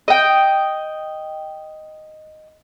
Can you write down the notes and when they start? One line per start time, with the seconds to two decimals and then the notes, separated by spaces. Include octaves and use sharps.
0.08 D#5 G5